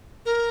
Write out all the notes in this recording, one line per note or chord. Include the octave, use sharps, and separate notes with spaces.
A#4